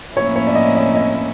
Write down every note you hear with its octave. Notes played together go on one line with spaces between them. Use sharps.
A2 F3 A#3 C#4 E4 C#5
C#5
D5
D#5
D#5
D#5